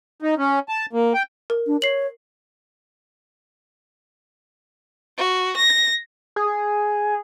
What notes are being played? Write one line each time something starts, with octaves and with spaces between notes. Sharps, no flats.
D#4
C#4
A5
A#3
G5
A#4
D4
C#5 C7 F#7
F#4
A#6
G#4